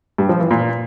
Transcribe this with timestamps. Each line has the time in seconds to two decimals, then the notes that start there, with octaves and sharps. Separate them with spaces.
0.18 G2
0.29 F3
0.40 E3
0.51 A#2